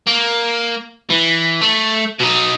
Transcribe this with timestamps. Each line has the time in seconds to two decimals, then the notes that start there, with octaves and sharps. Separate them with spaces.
0.07 A#3
1.10 E3
1.62 A3
2.20 B2 D#4